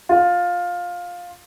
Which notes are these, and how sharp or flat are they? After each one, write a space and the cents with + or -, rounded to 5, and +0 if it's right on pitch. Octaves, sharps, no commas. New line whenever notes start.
F4 +15